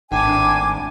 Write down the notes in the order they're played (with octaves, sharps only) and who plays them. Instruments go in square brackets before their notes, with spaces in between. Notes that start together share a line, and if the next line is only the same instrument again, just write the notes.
[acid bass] G#1 [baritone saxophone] A2 [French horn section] D4 [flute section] G#5 D6